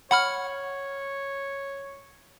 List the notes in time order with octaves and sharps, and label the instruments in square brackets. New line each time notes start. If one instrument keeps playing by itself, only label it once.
[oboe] C#5 [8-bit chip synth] F#5 B5 F6